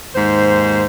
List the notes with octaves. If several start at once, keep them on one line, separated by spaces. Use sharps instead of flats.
D#2 G#2 C5